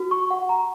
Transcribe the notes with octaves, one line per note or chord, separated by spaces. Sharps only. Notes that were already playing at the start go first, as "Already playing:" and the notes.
Already playing: F#4
C#6
F#5
A#5